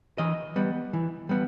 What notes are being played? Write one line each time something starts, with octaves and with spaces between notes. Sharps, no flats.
E3 D#5
G3 B3
E3
G3 B3